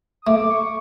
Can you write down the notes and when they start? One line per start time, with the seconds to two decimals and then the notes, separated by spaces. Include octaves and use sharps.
0.22 D#6
0.27 A3 D6
0.51 C#6